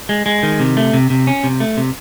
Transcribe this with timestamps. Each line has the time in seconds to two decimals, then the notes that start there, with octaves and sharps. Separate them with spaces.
0.09 G#3
0.26 G#3
0.43 D#3
0.60 C3
0.77 A3
0.93 C3
1.10 C3
1.27 C#4
1.43 C3
1.60 A3
1.77 C3